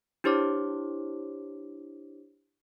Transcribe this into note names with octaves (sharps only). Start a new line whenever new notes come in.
D4 E4 G4 C5 C#5 D6